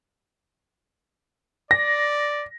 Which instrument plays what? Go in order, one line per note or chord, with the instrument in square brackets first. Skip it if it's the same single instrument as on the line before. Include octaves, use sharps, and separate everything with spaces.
[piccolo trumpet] D5 [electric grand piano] A#6